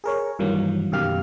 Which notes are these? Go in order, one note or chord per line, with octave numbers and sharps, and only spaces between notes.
G#4 A#4 C#5
G2 D#3 E3 F#3 A#3
F#2 B2 D#3 G4 F5 F6